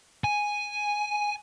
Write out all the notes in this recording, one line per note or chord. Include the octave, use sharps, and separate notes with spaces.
G#5